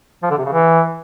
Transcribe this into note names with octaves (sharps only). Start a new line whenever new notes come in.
F3
D3
C3
C#3
E3